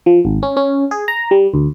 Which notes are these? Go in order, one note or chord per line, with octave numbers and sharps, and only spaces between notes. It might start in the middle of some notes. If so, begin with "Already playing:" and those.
F3
G#1
C#4
C#4
G#4
A#5
G3
D2